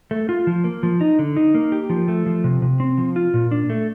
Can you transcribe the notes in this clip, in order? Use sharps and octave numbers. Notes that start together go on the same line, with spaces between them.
A3
F4
F3
A#3
F3
D#4
D3
D#4
A#3
G4
F3
A3
F3
C3
C3
C4
F3
F4
A#2
D4
A3